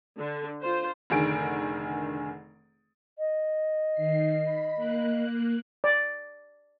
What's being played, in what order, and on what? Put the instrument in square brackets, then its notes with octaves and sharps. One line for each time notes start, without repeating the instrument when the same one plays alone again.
[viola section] D3
F4 C5
[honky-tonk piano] F1 D3 D#3 G#4 D7
[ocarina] D#5
[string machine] D#3 C7
B5
A#3 F#6
[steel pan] D5